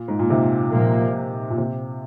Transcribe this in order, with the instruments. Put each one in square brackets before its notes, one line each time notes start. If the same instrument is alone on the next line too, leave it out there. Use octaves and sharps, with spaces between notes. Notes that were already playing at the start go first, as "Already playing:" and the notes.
Already playing: [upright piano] A#2
G#2
A#2
G#2 C3
[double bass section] A#2 F3 A#3
[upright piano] A#2
C3